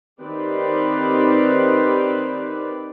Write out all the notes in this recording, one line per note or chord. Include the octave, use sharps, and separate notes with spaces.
D#3 C4 D#4 G4 B4 D5